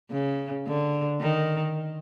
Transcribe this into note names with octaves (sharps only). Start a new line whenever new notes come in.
C#3
D3
D#3